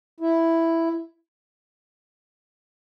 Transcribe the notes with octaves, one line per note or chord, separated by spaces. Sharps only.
E4